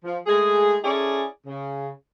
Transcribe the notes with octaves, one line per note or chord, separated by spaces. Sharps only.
F3
G#3 A3 G#4
C#4 E4 G#4 A4 D5
C#3